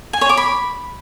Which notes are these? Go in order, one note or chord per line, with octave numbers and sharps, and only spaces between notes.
G#5
C#5
D6
B5